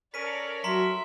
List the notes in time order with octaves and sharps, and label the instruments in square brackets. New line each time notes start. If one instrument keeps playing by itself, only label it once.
[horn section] C#4 A4 A#4 [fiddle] C#5 D5 [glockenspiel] B6 D#7
[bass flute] F#3 [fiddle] E5 [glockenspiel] A#5 C6 B6